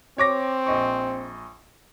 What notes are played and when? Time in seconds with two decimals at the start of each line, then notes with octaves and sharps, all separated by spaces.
0.18 C4 C#5 D6 A#6
0.66 A#1 D#5 C#6